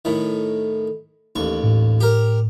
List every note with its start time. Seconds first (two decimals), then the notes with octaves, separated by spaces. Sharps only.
0.05 A2 D#3
1.36 A1 D#2 C#6
1.64 A2
2.00 G4 A#4